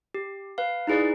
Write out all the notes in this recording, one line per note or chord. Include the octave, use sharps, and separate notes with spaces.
G4
B4 F5
D#4 E4 G#4 B4 D5